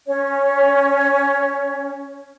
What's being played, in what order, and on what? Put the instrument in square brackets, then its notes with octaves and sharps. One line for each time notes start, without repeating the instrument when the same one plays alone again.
[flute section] C#4 C#5